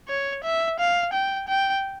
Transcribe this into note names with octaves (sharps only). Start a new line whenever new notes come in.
C#5
E5
F5
G5
G5